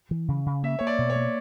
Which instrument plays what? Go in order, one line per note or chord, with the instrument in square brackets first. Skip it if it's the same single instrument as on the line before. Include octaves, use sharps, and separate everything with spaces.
[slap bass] E3
C#3
C#3
[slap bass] A#3 [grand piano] E5
[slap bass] A#3 [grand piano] C#5
[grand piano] D5
[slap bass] B2
[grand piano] C#5
[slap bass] A#3